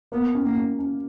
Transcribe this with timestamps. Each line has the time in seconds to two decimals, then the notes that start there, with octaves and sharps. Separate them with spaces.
0.12 A#3 B3
0.35 C#4
0.46 A#3
0.56 C#4
0.79 C#4